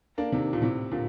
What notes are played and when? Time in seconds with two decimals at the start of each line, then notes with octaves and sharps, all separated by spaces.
0.18 A#3 D4
0.32 C3 D#3
0.53 A#2
0.62 A2 C3
0.91 A#2 D3